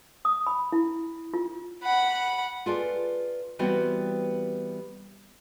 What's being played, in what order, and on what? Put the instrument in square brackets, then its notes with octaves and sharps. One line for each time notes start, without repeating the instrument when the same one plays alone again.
[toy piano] D#6
B5
E4
F4
[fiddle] F#5 B5
[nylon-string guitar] F4 G#4 A4 B4 D5
E3 G3 B3 C4 F#4 G4